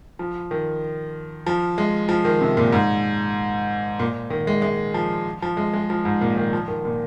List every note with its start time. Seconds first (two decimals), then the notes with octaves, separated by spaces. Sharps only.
0.19 F3
0.51 D#3
1.46 F3
1.78 G#3
2.09 F3
2.25 D#3
2.41 C3
2.57 A#2
2.72 G#2
3.99 A#2
4.30 D#3
4.47 G#3
4.62 G#3
4.94 F3
5.42 F3
5.57 G#3
5.74 G#3
5.90 F3
6.05 G#2
6.21 A#2
6.37 D#3
6.53 F3
6.68 D#3
6.85 A#2